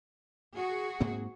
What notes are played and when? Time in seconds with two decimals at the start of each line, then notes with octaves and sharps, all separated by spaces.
0.56 F#4 G#4
1.00 G#2 A#3 C4